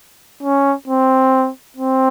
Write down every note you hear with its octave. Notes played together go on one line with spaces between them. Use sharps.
C#4
C4
C4